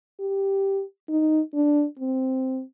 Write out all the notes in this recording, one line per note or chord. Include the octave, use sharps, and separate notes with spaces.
G4
D#4
D4
C4